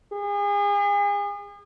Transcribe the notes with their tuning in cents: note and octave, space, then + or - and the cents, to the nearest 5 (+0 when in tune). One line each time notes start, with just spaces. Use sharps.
G#4 -35